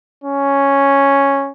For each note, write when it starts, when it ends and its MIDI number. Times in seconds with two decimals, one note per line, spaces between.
0.24 1.52 61